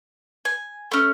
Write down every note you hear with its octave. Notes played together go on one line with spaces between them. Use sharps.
G#5
A3 C#4